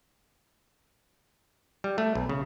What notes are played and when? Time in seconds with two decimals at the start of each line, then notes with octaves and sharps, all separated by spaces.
1.84 G3
1.98 A3
2.15 B1
2.29 C#3